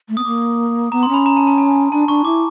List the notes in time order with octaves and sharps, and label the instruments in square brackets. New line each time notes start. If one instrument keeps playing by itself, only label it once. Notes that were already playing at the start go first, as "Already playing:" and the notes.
[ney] A3
[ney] B3 [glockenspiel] D#6
[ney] A#3 [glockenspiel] D6
[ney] B3 [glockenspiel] A#5
[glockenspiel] C6
[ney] C#4 [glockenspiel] B5
[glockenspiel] A#5
A5
A5
G#5
[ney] D4 [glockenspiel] A5
[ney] D4 [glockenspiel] C#6
[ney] E4 [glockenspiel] D6